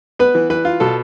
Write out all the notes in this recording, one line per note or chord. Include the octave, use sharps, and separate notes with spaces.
B3 B4
E3
E3 B4
F4
B2 A4